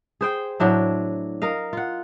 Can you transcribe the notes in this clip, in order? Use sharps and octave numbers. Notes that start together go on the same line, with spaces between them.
G#4 C5 G5
A2 F#3 D4 E4
A#4 D#5 F5
F4 F#5